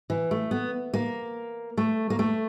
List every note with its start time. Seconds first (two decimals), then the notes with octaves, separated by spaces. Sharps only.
0.10 E3
0.31 A3
0.51 B3
0.94 A#3
1.77 A3
2.10 A#3
2.19 A3